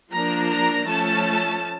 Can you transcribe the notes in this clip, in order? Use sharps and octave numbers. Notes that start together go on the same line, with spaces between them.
F3 A#3 D4 A#5
A#5
F3 A3 C#4 A5